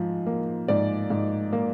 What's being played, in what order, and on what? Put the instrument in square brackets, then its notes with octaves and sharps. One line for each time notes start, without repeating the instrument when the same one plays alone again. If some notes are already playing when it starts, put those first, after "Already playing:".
Already playing: [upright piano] G#2 F3
A#3
G#2 D5
G#2
A#3